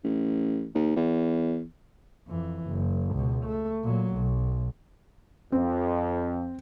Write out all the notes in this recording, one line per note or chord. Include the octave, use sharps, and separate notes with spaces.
A1
D#2
E2
F2 E3
F#1
C#2 B2
A3
A#2 F#3
B1
F2 C4